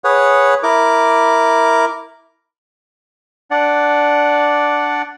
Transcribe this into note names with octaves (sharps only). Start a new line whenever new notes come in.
G#4 B4 C#5 F#5
E4 A#4 D6
D4 D5 F#5